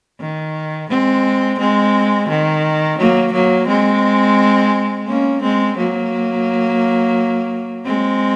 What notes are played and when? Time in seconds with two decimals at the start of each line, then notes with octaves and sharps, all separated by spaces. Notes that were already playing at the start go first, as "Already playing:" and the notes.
0.20 D#3
0.90 G#3 C4
1.59 G#3 C4
2.29 D#3
2.99 F#3 A#3
3.33 F#3 A#3
3.68 G#3 C4
5.07 A#3 C#4
5.42 G#3 C4
5.77 F#3 A#3
7.85 G#3 C4